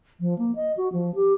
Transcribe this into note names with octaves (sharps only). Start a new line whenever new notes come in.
F3
A#3
D#5
F#4
F3
G4